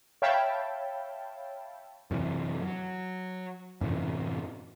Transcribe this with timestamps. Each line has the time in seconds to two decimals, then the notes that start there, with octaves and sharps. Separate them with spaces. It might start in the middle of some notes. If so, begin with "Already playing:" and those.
0.22 C#5 E5 F5 G5 A5 B5
2.11 F#2 C3 E3
2.62 F#3
3.81 F#2 A2 C3 E3